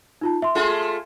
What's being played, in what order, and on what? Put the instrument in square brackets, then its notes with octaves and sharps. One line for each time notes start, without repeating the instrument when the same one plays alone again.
[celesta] D#4 F4 A5
E5 C6
[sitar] A3 F4 G#4